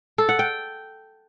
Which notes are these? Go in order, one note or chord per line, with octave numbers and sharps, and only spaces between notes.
A4
F#5
G5